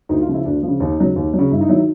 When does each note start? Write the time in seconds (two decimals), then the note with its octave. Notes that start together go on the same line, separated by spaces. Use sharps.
0.09 D2 D#4
0.21 F4
0.28 C#3 F3
0.34 E4
0.45 D2 D4
0.63 F3
0.68 C#3
0.80 D#2 D#4
0.99 C#3 F#3
1.16 D#2
1.33 F#3
1.39 C#3
1.51 G2 E4
1.61 D#4
1.69 F#3 E4
1.73 D#3